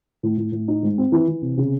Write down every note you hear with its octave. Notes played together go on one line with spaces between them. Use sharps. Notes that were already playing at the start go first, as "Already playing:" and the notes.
A2
A2
A2
D#4
G#2
C4
E3
E3
C3
C#3